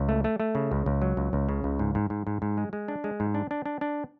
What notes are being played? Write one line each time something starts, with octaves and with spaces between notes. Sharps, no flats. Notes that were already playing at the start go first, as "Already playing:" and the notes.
Already playing: C#2
A3
A3
A3
C#3
C#2
C#2
F#3
C#2
C#2
C#3
C#2
G#2
G#2
G#2
G#2
G#2
G#3
G#3
D4
G#3
G#2
D4
D4
D4
D4